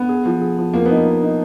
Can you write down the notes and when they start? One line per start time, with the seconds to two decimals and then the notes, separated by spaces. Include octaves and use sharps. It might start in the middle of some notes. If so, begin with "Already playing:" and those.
Already playing: B3
0.09 G#4
0.25 F3
0.41 G#4
0.58 F3
0.74 F3 A#3
0.86 B3 D#4
0.97 A#3
1.06 D#4
1.22 D#4